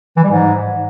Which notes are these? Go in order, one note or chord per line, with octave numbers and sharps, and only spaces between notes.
E3
G3
G#2